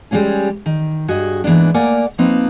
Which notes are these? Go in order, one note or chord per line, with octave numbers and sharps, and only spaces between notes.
G3 G#3 A#3 C#4 G#4
D#3
G2 F#4 G#4 D#5
G#2 E3 A#3 B3 D4
A3 A#3 A#4 D5 F#5 G#5
F3 A#3 C4 D#4 B4